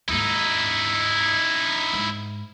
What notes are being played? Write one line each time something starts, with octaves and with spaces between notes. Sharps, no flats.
D#2 G#2 D#4 E4
G#2